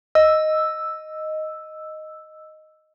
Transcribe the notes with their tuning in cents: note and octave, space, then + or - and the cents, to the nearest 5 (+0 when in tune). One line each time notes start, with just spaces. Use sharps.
D#5 +0 E6 +0